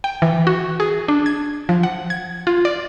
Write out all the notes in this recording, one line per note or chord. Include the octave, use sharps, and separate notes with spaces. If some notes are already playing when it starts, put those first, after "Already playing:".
G5
E3
F#4
G#4
D4
G#6
F3
F#5
G#6
F4
D5